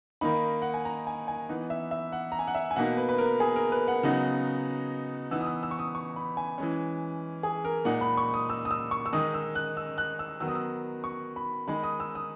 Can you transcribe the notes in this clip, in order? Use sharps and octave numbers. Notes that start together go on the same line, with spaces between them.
D#3 A#3 D#4 B5
F#5
G#5
A#5
G#5
G#5
E3 B3 D#4
E5
E5
F#5
A#5
G#5
F#5
E5
G#5
B2 A#3 D#4 F#5
B4
B4
A#4
G#4
A#4
B4
F#5
C#3 F#3 B3 D#4
E3 B3 D#4 E6
D#6
E6
E6
C#6
D#6
C#6
B5
G#5
E3 G#3 C#4
G#4
A#4
A#2 G#3 D#4 F#5
B5
C#6
D#6
E6
D#6
E6
C#6
E6
D#3 G#3 D#4 D#6
E6
F#6
E6
F#6
E6
D#3 F#3 B3 E6
D#6
E6
C#6
B5
D#3 G#3 D#4 B5
D#6
E6
D#6